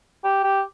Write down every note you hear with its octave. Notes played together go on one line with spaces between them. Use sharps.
G4
G4